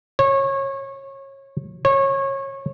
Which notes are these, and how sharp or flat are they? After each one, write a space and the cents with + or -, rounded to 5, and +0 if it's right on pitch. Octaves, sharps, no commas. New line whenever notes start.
C#5 -25
C#5 -25